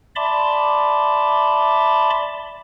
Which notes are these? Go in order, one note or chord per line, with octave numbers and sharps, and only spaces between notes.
D5 E5 A5 B5 C6 D6